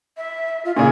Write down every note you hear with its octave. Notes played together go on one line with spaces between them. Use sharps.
E5
F4
A#2 C#3 G#5